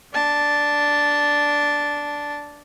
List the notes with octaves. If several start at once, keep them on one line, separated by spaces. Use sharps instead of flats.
D4 A5